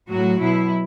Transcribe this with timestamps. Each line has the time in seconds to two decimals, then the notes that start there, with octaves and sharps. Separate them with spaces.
0.11 A2 F#3 F#4
0.40 B2 F#3 E4